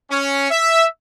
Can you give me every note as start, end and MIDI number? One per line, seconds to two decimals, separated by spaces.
0.11 0.50 61
0.51 0.86 76